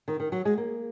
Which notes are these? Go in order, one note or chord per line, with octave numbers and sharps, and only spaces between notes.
D#3
D#3
F#3
G#3
A#3